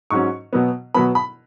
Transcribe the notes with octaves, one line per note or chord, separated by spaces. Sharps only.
G#2 F#3 C#4 C#6
B2 F#3 B3
B2 F#3 B3 B5
B5